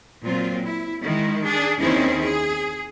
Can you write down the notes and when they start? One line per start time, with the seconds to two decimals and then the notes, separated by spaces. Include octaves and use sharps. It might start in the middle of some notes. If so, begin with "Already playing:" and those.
0.25 A#2 F#3 C4 F4
0.64 E4
1.04 D#3 G#3 E4
1.43 D4 G#4
1.81 D#2 D#3 C4 C#4 E4 G#4
2.22 G#4